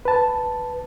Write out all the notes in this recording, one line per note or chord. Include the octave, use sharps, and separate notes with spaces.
B4 A5